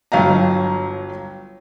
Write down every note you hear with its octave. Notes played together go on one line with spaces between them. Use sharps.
G1 F#3 F5 G5 A#5